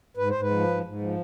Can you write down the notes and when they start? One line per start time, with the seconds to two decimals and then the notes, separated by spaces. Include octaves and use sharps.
0.17 G#2 B4
0.29 C5
0.35 G#2
0.41 B4
0.51 F3
0.68 G#2
0.84 G#2
1.01 F3